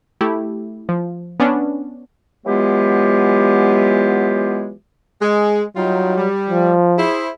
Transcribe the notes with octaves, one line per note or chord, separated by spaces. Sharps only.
A3 E4 G4
F3
B3 C#4 D4
E3 F#3 G#3 B3 F4 G4
G#3
F#3 G3 D#4 F4
G3
F3
E4 G#4 C5